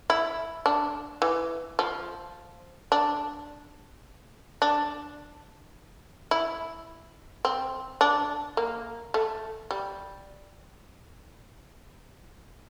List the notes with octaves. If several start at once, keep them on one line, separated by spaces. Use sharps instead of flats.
E4
D4
E3
F3
D4
D4
E4
C4
D4
A#3
A3
G3